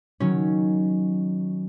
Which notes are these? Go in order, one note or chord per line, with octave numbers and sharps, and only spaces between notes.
D#3 F#3 C#4